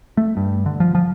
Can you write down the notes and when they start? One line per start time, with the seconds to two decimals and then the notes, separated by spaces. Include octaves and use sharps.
0.17 A3
0.37 G2
0.66 D3
0.80 F3
0.95 F3